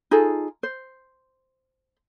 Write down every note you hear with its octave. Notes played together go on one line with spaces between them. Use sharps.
D#4 F4 G#4 A4
C5